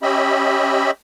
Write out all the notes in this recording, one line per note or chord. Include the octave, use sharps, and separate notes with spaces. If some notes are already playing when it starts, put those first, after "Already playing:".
C#4 G4 D#5 E5 B5